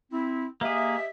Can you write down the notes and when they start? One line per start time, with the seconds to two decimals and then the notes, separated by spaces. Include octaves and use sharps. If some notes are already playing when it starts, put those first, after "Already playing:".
0.11 C4 E4
0.61 A#3 G4 G#4 D#5 E5